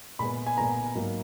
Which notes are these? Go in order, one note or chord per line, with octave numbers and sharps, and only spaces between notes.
A#2 G#3 B3 B5
G#5
A#2 G#3 B3 A#5
G#2 F#3 A#3